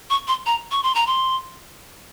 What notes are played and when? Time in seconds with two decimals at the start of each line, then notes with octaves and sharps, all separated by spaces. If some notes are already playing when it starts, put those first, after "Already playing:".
0.10 C#6
0.28 C6
0.46 A#5
0.71 C#6
0.83 C6
0.95 A#5
1.07 C6